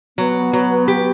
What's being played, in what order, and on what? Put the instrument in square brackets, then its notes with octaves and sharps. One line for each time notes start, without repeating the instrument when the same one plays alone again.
[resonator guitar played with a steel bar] F#3 [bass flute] B3
[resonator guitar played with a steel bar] F#3
G4